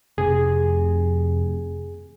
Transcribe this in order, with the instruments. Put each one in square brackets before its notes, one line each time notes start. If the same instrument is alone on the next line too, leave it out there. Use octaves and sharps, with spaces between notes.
[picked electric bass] F1 C3 [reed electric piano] G#4